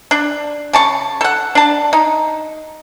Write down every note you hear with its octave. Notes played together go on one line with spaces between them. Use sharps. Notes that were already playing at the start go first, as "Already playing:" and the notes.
D4
C#3 A5 C#6
A4 F#5
D4 A5
D#4